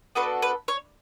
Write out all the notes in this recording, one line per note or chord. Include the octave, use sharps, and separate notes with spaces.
B3 D4 F#4 A4 B4
B4
C#5